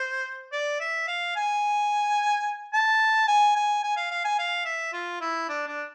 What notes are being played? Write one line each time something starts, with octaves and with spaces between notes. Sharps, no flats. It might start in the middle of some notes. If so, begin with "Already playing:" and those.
Already playing: C5
D5
E5
F5
G#5
A5
G#5
G#5
G#5
F5
F5
G#5
F5
E5
F4
E4
D4
D4